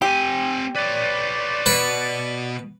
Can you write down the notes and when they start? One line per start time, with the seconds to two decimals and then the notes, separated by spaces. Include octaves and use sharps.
0.02 C4 G4 G#5
0.76 B4 C#5 D5
1.66 B2 B4